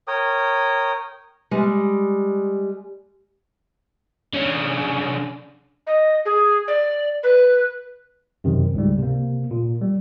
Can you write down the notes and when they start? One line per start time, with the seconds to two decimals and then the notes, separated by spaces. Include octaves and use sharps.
0.07 A#4 C#5 G5 D#6
1.51 G3 G#3
4.33 D3 C#4
5.87 D#5
6.25 G#4
6.68 D5
7.23 B4
8.44 F#2 C3 D#3
8.74 C#2 G#2 G3
8.98 C3 A#3
9.51 A#2
9.81 G3